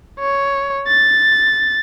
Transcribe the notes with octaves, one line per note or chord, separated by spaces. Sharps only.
C#5
A6